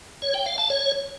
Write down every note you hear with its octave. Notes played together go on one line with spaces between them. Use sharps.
C#5
G5
F5
A5
C#5